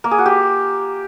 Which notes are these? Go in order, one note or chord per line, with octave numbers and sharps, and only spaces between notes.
A#3
G#4
F#4
G4